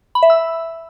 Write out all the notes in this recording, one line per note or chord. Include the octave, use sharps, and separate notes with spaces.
B5
E5
E6